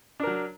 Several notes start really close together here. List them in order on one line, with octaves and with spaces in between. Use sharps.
D4 A#4 F#3